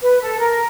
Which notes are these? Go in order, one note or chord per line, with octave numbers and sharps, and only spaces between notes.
B4
A4
A#4